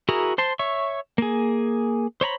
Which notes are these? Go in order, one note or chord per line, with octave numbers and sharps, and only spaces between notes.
E4 F#4 G#4 A#4 A#5
C5 A5 C6
C#5 E5 C#6
A#3 G#4
C5 C#5 A#5 B5